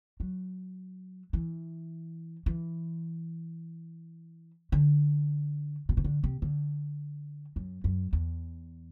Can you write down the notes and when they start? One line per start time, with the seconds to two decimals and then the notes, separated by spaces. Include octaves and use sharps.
0.20 F#3
1.33 E3
2.46 E3
4.72 D3
5.89 B2
5.97 C3
6.04 D3
6.24 C3
6.42 D3
7.56 F#2
7.84 F#2
8.13 E2